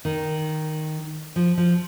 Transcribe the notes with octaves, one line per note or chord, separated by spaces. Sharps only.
D#3
F3
F3